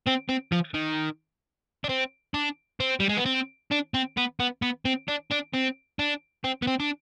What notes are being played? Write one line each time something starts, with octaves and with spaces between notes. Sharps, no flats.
C4
C4
F3
D#3
D4
C4
D4
C4
G3
G#3
B3
C4
D4
C4
B3
B3
B3
C4
D4
D4
C4
D4
C4
B3
C4
D4